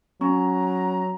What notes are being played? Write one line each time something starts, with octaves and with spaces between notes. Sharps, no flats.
F#3 C#4 A#5